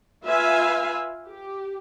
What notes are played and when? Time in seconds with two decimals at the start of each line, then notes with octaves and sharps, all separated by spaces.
0.24 F4 B4 E5 F5 G#5
1.27 G4